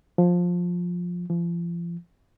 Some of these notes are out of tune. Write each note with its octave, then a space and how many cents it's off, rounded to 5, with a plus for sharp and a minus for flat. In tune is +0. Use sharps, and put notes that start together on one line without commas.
F3 +15
F3 -35